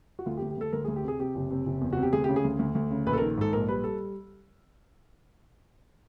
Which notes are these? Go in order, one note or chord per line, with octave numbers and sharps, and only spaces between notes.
F#4
D2 F4
G4
D2
G4
D2 A4
D2 A#4
G#4
D2
G4
C3 G#4
C3 G4
F#1
C3
F#1
E2
C3 F#4
G4
D2 G#4
G4
C#3
G#4
D2
D2
D2
C#3
A#1 B4
A4
A#4
D#3
G#2 A4
A#1 A#4
G3 B4
G3 A4